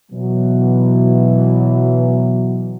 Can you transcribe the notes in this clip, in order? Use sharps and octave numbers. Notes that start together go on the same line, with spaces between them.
B2 E3 F#3